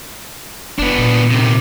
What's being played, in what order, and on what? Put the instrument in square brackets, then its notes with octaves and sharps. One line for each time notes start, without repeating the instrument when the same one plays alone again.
[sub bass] F1 [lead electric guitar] B3 D4
[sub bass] A#2
[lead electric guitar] C3 D#3